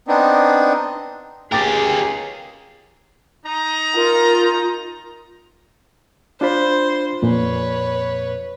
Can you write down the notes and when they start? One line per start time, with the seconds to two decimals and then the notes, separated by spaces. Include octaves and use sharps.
0.08 B3 C4 D4 D#4
1.52 C#2 G4 G#4 A#4 G5 D6 A6
3.46 D#4 A#5
3.95 F4 A#4
6.41 D4 F4 C5 B5
7.22 F2 A#2 B4 C#5